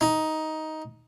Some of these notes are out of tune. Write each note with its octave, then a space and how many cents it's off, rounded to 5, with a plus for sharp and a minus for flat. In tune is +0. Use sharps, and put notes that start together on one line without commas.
D#4 +10